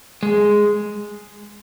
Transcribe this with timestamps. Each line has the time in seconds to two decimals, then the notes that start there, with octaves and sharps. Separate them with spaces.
0.23 G#3